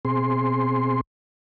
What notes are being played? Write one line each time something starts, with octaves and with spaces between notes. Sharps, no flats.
B2 C4 G#4 C6